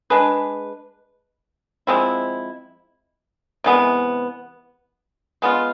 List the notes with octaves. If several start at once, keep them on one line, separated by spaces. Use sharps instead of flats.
G#3 D4 G#4 B4
F3 G#3 C4 E4
C3 E3 G#3 B3
G#3 B3 F4